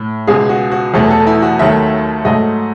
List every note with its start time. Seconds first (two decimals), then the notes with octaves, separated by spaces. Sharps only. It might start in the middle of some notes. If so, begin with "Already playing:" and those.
Already playing: A2
0.27 C#2 B2 G#3 G#4
0.49 F#4
0.72 F#4
0.94 E2 B2 F#3 A3 G#4
1.11 A4
1.27 E4
1.42 F#4
1.59 D#2 D#3 F#3 A3 E5
2.25 G#2 F#3 A3 D#5